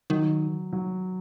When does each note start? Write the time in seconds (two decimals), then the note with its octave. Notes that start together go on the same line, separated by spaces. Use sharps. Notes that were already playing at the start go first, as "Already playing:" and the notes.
0.10 D#3 F#3
0.73 F#3